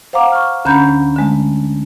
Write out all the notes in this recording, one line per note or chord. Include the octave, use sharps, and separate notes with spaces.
C5 F5 F#5 A#5 D6
C#6 F6
D2 D3 C#4 A#5 B5 G6
D3 G#3 A3